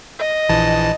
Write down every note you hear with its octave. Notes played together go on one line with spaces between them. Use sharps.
D#5
A#1 E3 A5